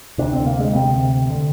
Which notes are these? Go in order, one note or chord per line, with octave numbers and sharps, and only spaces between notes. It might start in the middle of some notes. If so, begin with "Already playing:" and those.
D2 C3 D4
C4
A#3
G#3
D2 C3 C4
D3